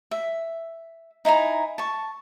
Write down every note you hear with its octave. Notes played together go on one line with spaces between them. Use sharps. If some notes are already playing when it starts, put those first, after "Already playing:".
E5
D#4 E4 G#5 A#5
A5 C#6